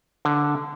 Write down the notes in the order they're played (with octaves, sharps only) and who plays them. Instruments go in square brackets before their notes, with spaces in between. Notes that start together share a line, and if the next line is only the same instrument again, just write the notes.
[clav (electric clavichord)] D3